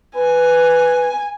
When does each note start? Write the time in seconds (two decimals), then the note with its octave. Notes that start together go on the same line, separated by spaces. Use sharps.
0.16 B4 G#5